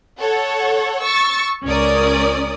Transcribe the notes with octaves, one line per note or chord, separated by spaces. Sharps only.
A4 C#5 F#5
C#6 E6 A6
C#2 C#4 A#4 D5 D#6